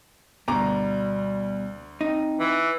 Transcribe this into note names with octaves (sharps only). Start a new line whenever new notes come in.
D2 B2 G3 A#5 D6
C4 D#4
E3